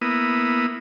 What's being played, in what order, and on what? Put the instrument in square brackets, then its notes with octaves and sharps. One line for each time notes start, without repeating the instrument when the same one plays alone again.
[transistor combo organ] A#3 B3 E4 D#6